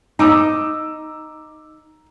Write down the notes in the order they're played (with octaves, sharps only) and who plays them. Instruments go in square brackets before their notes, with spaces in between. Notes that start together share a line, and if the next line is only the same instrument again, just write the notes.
[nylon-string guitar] D#4 [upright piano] A#5 D6 E6